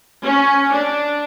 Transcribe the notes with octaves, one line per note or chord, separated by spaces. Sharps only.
C#4
D4